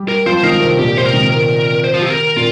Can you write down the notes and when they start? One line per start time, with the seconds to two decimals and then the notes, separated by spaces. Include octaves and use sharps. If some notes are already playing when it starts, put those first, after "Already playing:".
Already playing: G3 G4
0.08 A#4
0.26 F3 F4 C5
0.43 D#3 D#4 A#4
0.61 C3 C4 A#4
0.79 A#2 A#3 G4
0.97 C3 C4 C5
1.06 A#4
1.13 D#3 D#4
1.31 A#4
1.84 C5
1.94 F4
2.02 G4
2.10 A#4
2.36 A#2 A#3 F4